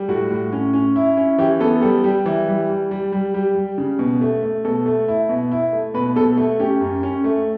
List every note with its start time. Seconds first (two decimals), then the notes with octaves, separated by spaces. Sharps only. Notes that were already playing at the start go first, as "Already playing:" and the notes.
Already playing: G3
0.09 A2 F#4
0.30 A2
0.52 C#4
0.73 C#4
0.96 E4
1.17 C#4
1.38 E3 G4
1.60 B3 A4
1.82 G3 A4
2.04 G3 G4
2.26 E3
2.47 G3
2.69 G3
2.91 G3
3.12 G3
3.34 G3 G4
3.55 G3
3.78 C#3
3.99 B2
4.21 A3
4.43 A3
4.64 B2 A4
4.86 A3
5.08 E4
5.29 B2
5.52 E4
5.73 A3
5.94 B2 B4
6.16 B2 A4
6.37 A3
6.59 C#4 G4
6.81 F#2
7.03 C#4
7.24 A3